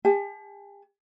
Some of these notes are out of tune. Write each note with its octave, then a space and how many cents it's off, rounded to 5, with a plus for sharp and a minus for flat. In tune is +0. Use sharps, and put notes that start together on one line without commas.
G4 +45 A5 -35